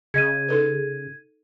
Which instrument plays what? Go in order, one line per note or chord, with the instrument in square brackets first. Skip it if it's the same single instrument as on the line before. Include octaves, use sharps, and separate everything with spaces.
[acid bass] C#3 [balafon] G#4 D#5 [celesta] G#6 D#7
[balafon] D#4 A4 B4